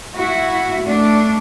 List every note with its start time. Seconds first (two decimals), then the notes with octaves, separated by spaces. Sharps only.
0.16 E4 F#4
0.83 A3 D4